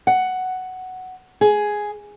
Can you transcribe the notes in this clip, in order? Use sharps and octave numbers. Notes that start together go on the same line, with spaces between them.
F#5
G#4